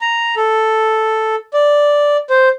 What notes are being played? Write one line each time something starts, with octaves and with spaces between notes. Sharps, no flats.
A#5
A4
D5
C5